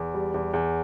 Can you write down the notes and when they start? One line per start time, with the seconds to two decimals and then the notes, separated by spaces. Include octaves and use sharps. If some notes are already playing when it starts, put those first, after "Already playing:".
Already playing: E2
0.14 G3
0.34 E2
0.54 E2